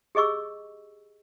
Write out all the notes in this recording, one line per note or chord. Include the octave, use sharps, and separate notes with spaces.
G4 G#4 D#5 C#6 E6